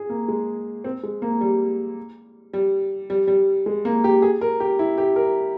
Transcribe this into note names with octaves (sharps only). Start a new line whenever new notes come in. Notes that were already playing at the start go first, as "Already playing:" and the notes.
Already playing: G#4
A#3
G#3
C4
G#3
A#3
G3
G3
G3
G3
G#3
A#3
G4
G#4
A#4
G4
E4
G4
A#4